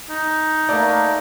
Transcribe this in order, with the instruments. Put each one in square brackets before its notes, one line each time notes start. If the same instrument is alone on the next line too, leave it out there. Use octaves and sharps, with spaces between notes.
[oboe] D#4
[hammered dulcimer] A3 A#3 [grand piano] D5